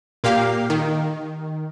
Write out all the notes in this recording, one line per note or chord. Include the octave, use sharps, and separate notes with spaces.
A#2 A#3 G4 F5
D#3